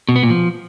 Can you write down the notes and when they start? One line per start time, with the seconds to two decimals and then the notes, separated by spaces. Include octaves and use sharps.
0.09 B2
0.16 B3
0.23 A#2
0.30 F3